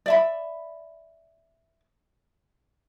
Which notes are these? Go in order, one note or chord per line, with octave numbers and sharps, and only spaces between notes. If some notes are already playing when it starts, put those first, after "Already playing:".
D5 E5 B5